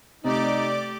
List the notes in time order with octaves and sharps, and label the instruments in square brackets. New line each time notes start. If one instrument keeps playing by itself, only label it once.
[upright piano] C3 [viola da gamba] A3 G4 [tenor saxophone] D#4 [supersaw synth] D5 D6